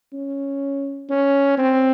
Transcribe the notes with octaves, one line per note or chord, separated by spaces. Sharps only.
C#4
C#4
C4